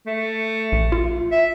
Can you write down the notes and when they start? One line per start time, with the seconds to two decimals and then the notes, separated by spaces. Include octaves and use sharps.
0.06 A3
0.72 A#1
0.92 F4
1.32 E5